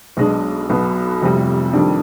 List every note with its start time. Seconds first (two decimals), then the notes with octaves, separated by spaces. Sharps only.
0.17 B1 B2 G#3 D4
0.70 B1 B2 B3
1.21 F1 F2 C3 G3
1.73 F2 D#3 G3 D4